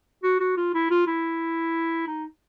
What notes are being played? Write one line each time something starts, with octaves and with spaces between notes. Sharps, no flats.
F#4
F#4
F4
E4
F4
E4
D#4